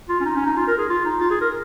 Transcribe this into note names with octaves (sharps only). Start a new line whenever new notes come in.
F4
C#4
D#4
C#4
D#4
F4
A#4
G#4
F4
D#4
F4
G#4
A#4